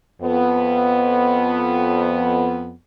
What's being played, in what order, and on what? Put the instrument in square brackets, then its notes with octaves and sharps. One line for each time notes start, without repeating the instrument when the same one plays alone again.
[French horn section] F2 B3